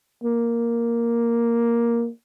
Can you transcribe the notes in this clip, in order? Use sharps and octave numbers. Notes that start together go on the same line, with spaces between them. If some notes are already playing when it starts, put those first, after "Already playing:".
A#3